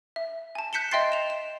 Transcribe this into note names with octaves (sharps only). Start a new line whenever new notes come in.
E5
G#5 A5
F#6 G6 B6 C#7 E7 G7
D#5 E5 G5 C6 A6 C7
E7 F7
E7